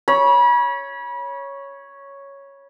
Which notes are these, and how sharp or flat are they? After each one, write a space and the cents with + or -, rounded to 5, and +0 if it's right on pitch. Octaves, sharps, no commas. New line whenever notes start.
C#5 +0 B5 -35